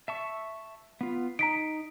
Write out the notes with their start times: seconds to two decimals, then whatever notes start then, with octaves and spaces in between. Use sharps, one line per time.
0.08 E5 A5 C#6
1.01 B3 F4
1.39 D#4 A#5 B6 D7